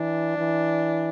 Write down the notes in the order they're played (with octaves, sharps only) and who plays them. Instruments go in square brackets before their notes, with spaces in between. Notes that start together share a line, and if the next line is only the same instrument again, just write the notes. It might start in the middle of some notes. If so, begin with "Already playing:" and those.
Already playing: [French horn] E3 [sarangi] D4
[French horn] E3